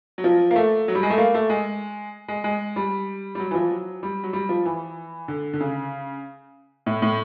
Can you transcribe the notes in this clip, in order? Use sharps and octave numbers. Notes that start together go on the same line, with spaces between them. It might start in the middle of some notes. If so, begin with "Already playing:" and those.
F#3
F3
A#3
A3
F#3
G3
G#3
A3
A#3
A3
G#3
G#3
G#3
G3
G3
F#3
E3
F3
F#3
G3
F#3
G3
F3
E3
D3
D3
C#3
A2
A2